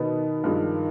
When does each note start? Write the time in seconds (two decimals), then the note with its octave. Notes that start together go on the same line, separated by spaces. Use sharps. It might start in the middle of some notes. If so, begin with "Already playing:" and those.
Already playing: B2 D#3 B3 D#4
0.44 G2 F3 G#3